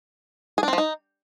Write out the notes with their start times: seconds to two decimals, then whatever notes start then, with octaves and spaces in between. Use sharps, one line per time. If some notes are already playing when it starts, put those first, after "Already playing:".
0.58 G#4
0.63 D4
0.68 C4
0.73 F3
0.78 D#4